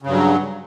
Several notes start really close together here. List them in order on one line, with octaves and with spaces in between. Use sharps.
C#3 G2 F#3